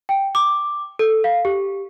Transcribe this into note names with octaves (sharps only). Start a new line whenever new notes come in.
G5
D6
A4
F5
G4